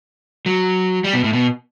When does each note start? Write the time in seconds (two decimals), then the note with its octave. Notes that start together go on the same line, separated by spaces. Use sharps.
0.46 F#3
1.04 G3
1.13 B2
1.24 A2
1.33 B2